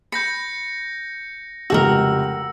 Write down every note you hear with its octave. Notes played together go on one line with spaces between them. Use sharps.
B5 G6 A#6 C#7
F1 C#2 F#4 G4 A4 A#4 E6